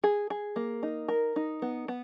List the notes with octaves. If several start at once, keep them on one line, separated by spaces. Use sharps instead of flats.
G#4
G#4
A#3
D#4
A#4
D#4
B3
B3